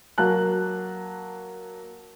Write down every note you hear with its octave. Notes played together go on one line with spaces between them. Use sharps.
F#3 A#3 A5 F#6